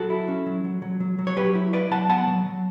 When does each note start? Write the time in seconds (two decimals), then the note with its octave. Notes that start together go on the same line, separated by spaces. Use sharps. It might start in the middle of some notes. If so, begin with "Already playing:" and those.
Already playing: F#3 F#4 A4
0.10 E4
0.28 C#4
0.46 F#3
0.64 F#3
0.82 F#3
1.00 F#3
1.19 F#3
1.27 C#5
1.37 F#3 G4 B4
1.55 E4
1.73 E4 B4 D5
1.91 F#3 F#5 A5
2.09 B3 F#5 A5
2.27 F#3
2.46 F#3